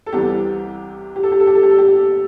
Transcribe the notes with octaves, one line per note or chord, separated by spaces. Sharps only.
A4
C2 C3 E3 G3 G4
G4
A4
G4
A4
G4
A4
G4
A4
G4